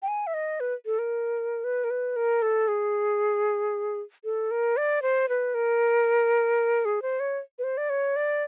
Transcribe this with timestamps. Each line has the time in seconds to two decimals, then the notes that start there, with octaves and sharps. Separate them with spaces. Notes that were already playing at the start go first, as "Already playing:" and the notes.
0.03 G5
0.08 G#5
0.27 E5
0.34 D#5
0.60 B4
0.86 A4
0.99 A#4
1.64 B4
1.84 A#4
1.90 B4
2.16 A#4
2.42 A4
2.68 G#4
4.24 A4
4.51 A#4
4.77 D5
5.02 C5
5.29 B4
5.54 A#4
6.85 G#4
7.02 C5
7.20 C#5
7.59 B4
7.64 C5
7.77 D5
7.90 C#5
8.16 D5